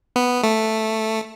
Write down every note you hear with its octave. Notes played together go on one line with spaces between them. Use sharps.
B3
A3